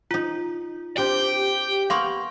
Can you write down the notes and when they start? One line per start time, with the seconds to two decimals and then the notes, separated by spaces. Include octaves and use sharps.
0.11 D#4 F4 A5
0.98 C4 D4 G4 G5
1.90 A#3 B3 F5 C6 C#6